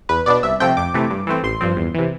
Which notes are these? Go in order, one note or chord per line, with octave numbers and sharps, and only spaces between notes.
E2 B4
B2 B3 D4 D5
C2 E5
C3 F3 A3 C4 G5
F2 D6
C3 E3 A3
G2
E3 A3 C4
A1 C6
G2 F3 C4
E2
C3 E3